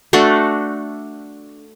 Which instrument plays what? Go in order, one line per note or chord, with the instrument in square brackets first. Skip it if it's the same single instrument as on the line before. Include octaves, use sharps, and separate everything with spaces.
[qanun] A3 D4 F#4 A4